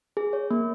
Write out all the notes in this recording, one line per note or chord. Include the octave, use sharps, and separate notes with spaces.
G#4
C#5
A#3